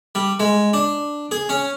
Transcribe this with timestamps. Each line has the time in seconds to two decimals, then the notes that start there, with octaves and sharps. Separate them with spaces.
0.15 G3
0.40 G#3
0.73 D4
1.31 G#4
1.49 C#4